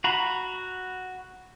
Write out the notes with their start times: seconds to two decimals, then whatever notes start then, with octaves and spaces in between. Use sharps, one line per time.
0.04 F#4 A#5 B5